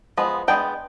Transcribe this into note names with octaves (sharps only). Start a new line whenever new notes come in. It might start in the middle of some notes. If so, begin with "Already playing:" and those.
F3 G#3 B3
G#3 B3 D4 G5